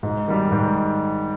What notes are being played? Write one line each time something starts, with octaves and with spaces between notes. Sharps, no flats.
G#2
D#3 G3
G#2